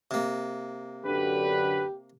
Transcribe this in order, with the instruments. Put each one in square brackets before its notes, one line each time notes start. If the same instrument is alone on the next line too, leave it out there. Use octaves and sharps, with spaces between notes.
[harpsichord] C3 A#3
[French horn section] F#2 D3 [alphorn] G4 [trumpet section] B4